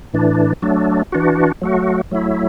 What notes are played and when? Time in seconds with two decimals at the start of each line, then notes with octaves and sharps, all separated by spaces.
0.14 A2 E3 D4
0.62 F#3 A3 D4
1.12 E3 D4 F#4
1.62 F#3 A3 F#4
2.11 F#3 A3 E4